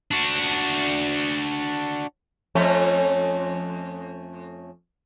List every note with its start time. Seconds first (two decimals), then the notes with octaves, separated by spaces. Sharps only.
0.11 D4 F#4
2.55 F2 A3 C#4